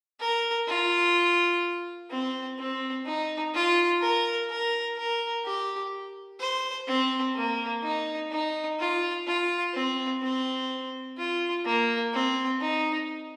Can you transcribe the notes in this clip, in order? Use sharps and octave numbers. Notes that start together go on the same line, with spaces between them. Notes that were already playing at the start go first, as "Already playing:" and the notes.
A#4
F4
C4
C4
D#4
F4
A#4
A#4
A#4
G4
C5
C4
A#3
D#4
D#4
F4
F4
C4
C4
F4
A#3
C4
D#4